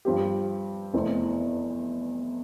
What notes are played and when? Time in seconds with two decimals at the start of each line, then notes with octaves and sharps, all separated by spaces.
0.05 G2 F3 C4 G4
0.93 F1 E2 E3 A3 C4